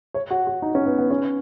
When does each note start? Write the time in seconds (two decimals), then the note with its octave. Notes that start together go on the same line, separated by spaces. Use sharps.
0.14 C#5
0.30 F#4
0.47 F#4
0.62 D#4
0.75 C#4
0.86 B3
0.99 B3
1.11 C#4